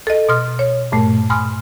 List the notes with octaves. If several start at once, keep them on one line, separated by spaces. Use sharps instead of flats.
A4 D#5
B2 C6 F6
C#5
G2 A#2 A3
G#5 B5 C6 D#6 F6